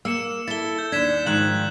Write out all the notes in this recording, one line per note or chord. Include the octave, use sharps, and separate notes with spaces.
A#3 E6 C#7 E7
E4 A4 A6 G7
G6
D#2 D4 G#6 B6 E7
G#2 D#3 F3 F#6 F#7